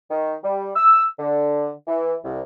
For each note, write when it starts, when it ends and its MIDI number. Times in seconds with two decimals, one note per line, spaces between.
0.10 0.35 51
0.44 0.70 55
0.76 1.06 88
1.19 1.70 50
1.88 2.15 52
2.25 2.41 36